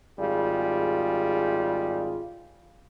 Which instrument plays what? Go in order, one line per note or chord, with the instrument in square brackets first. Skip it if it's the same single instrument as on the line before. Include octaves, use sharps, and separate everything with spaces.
[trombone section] G#1 G3 F4 G#4